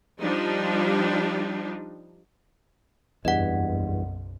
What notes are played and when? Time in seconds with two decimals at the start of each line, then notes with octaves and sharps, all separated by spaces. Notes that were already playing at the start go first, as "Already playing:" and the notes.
0.21 F3 G3 D4 D#4
3.25 F#1 B1 E2 G2 D#5 F#5